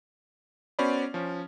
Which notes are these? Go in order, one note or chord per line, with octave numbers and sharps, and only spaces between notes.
B3 C#4 F#4 C5 D5 B5
F3 C#4